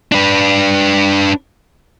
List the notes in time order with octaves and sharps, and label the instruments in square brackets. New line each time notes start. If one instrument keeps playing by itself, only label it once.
[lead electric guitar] D4 B4